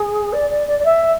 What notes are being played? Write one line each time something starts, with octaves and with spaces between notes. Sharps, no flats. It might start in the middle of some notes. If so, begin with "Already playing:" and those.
Already playing: G#4
D5
D5
D5
D5
E5